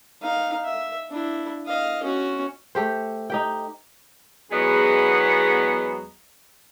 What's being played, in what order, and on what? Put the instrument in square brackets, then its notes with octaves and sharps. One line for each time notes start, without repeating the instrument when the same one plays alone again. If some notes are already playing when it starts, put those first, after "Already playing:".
[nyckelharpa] D#4 F5
E5
D4 E4
D#5 F5
C#4 F#4
[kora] A3 G4 C5
D#4 G4 G5
[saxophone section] E2 F#3 G#3 B3 G#4 D#5